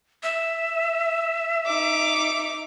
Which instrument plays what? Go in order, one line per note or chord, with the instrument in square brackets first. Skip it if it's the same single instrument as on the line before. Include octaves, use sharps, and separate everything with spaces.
[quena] E5
[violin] D#4 D6